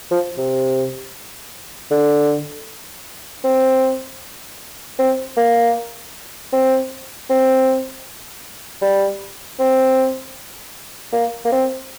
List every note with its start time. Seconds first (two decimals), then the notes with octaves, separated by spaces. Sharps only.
0.12 F3
0.38 C3
1.91 D3
3.44 C4
4.99 C4
5.37 A#3
6.53 C4
7.30 C4
8.82 G3
9.60 C4
11.13 A#3
11.45 A#3
11.52 C4